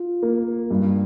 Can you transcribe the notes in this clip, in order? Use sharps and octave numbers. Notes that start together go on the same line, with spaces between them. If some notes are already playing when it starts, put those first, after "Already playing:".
Already playing: F4
A#3
G2